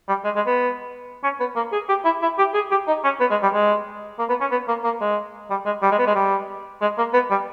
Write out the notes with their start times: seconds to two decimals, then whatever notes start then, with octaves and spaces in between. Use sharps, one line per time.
0.09 G3
0.24 G#3
0.36 G#3
0.46 B3
1.23 C#4
1.40 B3
1.56 A#3
1.73 G#4
1.89 G4
2.05 E4
2.22 E4
2.38 G4
2.54 G#4
2.71 G4
2.87 D#4
3.04 C#4
3.20 B3
3.30 G#3
3.43 G3
3.54 G#3
4.19 A#3
4.29 B3
4.41 C#4
4.51 B3
4.68 A#3
4.84 A#3
5.01 G#3
5.50 G3
5.66 G#3
5.82 G3
5.91 G#3
5.99 B3
6.07 G#3
6.15 G3
6.81 G#3
6.98 A#3
7.13 B3
7.31 G3